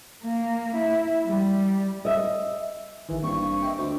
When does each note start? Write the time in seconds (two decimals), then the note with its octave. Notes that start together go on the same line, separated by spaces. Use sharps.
0.23 A#3
0.75 E4
1.25 G3
2.05 D#5 E5
3.09 A1 D#3 E3
3.23 G2 A#3 C4 C#6
3.63 D#5 E5 G5
3.78 D2 C5